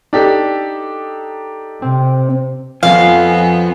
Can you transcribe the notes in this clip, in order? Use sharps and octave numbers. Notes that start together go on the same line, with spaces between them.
D4 D#4 G4 A4
C3 C4
F2 F3 B3 C4 F5 G#5